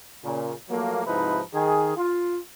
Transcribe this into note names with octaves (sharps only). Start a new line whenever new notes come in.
A#2 C#3
F3 F#3 A3 A#3
G#2 C3 F3 D#4 E4 B4
D#3 G#4
F4